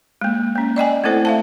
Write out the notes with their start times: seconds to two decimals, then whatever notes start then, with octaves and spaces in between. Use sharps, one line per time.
0.21 G#3 A#3
0.55 A#3 C#4
0.76 D5 D#5 G5 G#5
1.04 A3 C4 E4 A4 C5
1.25 E5 F5 A5